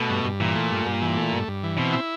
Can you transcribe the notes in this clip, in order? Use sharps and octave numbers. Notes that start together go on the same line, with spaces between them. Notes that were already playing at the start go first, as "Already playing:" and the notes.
Already playing: B2 A3
G2
G2
A#2 E3
A3
G2
G2
E3
A3
G2
G2
E3
B2 C4
E4